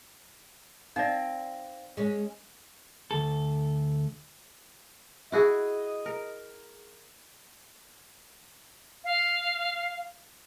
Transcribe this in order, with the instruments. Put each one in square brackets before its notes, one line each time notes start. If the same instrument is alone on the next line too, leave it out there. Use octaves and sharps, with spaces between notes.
[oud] C4 [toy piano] D#4 D5 [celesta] F5 A#6
[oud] G#3 C#4
[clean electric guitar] D2 A4
[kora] E4 F#4 G#4 [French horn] D#5
[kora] A#4
[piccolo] F5